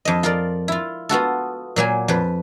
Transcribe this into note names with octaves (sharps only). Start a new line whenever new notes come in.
F2 D#5
F4 A#4 D5
E4 F4
B3 F4 F#4 A4
A#2 F#3 A#3 G#5
F2 B4